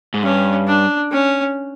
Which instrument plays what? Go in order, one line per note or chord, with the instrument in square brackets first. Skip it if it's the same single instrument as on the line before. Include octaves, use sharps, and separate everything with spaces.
[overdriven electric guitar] G#2
[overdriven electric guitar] G2 [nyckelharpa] C#4
[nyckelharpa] D4
C#4